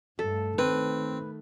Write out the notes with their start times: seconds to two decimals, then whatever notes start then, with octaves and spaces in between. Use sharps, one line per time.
0.19 G2 A3 A4
0.58 D#3 A3 C4 B4